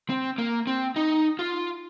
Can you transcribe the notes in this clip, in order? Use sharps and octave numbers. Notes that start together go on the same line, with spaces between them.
C4
A#3
C4
D#4
F4